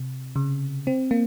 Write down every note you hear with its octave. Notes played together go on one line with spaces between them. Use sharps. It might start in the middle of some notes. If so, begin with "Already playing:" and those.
Already playing: C3
C#3
C4
A#3